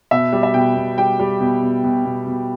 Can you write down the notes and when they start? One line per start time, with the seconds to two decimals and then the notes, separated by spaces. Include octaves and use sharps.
0.11 B2 E5
0.32 G3
0.43 E5
0.54 B2 G5
0.76 B2
0.98 G3 G5
1.19 G3
1.40 B2
1.62 B2
1.84 B2
2.05 B2
2.27 B2